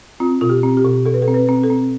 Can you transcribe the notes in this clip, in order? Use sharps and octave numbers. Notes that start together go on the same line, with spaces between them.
C4 F4
B2 F4
G4
C4
G4
B2
B2 A4
B4
A4
C4
B4
C4
A4
C4